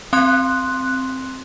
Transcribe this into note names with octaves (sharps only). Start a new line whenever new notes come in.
C4 C6 F#6